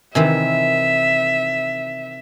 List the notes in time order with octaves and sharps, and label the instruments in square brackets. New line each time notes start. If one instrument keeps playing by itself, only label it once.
[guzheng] C3 D#3 E3 [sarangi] E5